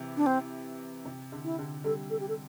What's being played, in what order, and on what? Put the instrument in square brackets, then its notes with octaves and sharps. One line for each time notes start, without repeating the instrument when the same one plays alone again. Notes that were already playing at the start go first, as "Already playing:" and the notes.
Already playing: [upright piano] C3 E3
[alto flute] D4
C4
[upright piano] C3
D3
[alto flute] E4
[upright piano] D3
[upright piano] D3 G3 [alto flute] A4
[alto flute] A4
G4
A4